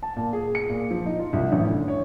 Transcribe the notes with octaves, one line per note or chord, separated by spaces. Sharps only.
A5
A#2
G#4
C#7
A#2
F3
D#4
F4
C2
A1
D2
C#5